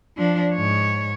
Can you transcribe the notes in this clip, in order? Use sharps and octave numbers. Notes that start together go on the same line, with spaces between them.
F3 D4
G#2 C#5